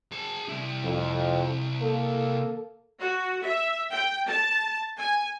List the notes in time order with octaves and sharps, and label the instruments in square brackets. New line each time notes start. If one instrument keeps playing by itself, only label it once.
[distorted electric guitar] G#4 A5
C3 E4
[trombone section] F2
A#3 A4
[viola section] F#4
E5
G5
A5
G#5